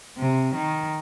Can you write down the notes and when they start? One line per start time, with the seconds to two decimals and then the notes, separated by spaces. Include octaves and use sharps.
0.18 C3
0.55 D#3